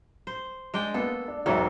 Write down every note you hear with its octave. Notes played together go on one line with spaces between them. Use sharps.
C5
G#3 D4 G5
A#3 B3 A4
D4
E1 G#2 F#3 A4 C#5 E5